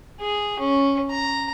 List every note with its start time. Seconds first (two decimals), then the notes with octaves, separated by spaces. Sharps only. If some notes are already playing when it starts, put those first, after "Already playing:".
0.21 G#4
0.60 C#4
1.11 A#5